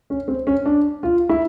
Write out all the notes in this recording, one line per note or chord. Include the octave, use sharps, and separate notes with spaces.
C#4
C4
C#4
D4
F4
E4